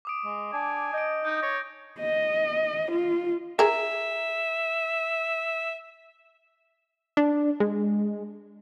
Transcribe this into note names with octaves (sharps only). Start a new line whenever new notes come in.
D6 D#6 D7
G#3
D4 G#5
D#5 G6 D7
D#4 G6
C#5 G6 A#6
D#5
F4
G#4 A#4 E5
D4
G#3